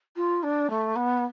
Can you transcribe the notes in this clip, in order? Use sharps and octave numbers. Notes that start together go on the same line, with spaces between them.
F4
D4
A3
B3